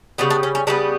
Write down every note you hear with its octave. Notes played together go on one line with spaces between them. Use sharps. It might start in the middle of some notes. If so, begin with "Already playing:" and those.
C#3 G3 B3 F#4
D4
C#4
C#4
C#3 G3 B3 D4